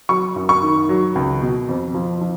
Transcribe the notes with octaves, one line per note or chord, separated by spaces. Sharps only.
F#3 C#6
F#2
C#6
D#3
F#3
C#2
B2
F2
F3
F3